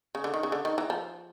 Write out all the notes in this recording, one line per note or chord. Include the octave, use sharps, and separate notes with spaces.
C#3
D3
D#3
C#3
D3
D#3
E3
F3